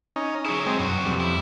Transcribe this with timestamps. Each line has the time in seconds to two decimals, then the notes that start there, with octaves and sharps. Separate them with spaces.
0.16 C#4 D#4
0.45 F#3 E4 G#4 C#5
0.66 G#3 C4
0.79 B1 F#2 F#4
1.05 F2 G3
1.20 E4